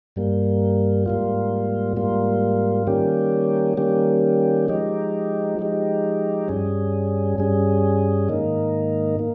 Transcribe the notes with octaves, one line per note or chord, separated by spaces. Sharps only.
G2 G3 A#3
G#2 G3 A#3 F4
G#2 G3 A#3 F4
D#3 G3 A#3 C#4 G4
D#3 G3 A#3 C#4 G4
F3 G#3 D#4 G4
F3 G#3 D#4 G4
G2 G3 C#4 G#4
G2 G3 C#4 G#4
G#2 D#3 A#3 D#4
A#3